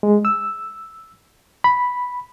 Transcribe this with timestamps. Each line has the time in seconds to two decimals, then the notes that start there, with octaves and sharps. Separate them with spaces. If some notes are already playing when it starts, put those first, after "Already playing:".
0.03 G#3
0.25 E6
1.64 B5